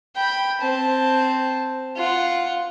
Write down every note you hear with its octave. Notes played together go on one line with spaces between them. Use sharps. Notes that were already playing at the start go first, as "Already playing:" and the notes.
G5 B5
C4 A5
F4 F#5